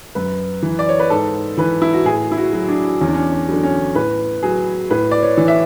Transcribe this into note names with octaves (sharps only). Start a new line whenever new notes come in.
F#2 B4
E3
D5
C#5
B4
G#2 A4
E3 B4
E4
F#4
A2 G#4
E4
F#4
F#3
D4
E2 C#4
D4
C#4
D4
D3 F#3
C#4
A2 B4
F#3 G#4
A2 B4
D5
C#5
E3
E5